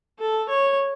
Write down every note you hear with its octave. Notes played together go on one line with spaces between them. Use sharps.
A4
C#5